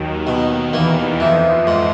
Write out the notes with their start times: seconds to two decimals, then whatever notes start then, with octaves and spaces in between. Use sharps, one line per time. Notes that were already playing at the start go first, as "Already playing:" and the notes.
Already playing: D#2 D#3 F#3
0.27 D#2 B2 D#3
0.73 E2 E3 A#3
1.20 F2 E3 F3
1.67 G#2